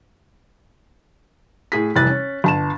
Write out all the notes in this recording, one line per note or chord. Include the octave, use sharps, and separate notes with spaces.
A2 G#4 B6
F1 E3 G3 F#6 A6
C#4
G1 A5 E7